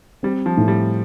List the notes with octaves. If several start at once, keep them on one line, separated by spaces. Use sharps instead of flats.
G3 C4
F3
A2
G3